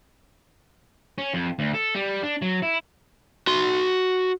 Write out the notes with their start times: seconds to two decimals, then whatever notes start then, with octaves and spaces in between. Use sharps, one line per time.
1.18 C#4
1.34 F2
1.59 D2
1.74 A4
1.95 G3
2.23 D4
2.42 F#3
2.62 E4
3.47 F#4 C6